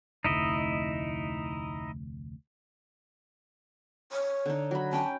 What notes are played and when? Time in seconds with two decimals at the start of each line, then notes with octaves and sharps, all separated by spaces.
0.24 F1 D2 D#4 E4 D#5
4.12 C#5
4.46 D3 D#4
4.71 F#3 B5
4.93 C#4 G5 A5